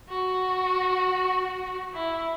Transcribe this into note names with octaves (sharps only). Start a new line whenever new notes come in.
F#4
E4